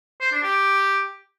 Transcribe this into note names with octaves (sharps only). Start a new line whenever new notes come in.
C5
D4
G4